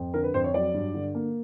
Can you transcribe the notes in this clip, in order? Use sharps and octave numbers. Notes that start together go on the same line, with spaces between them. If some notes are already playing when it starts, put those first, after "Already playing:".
Already playing: F2
D3 A#4
B4
F2 C5
C#5
F#3 D5
G2
D3
A#3